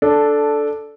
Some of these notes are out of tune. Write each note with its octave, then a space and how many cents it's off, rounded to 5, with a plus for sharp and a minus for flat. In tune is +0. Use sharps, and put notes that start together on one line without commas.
D4 +0 A4 -5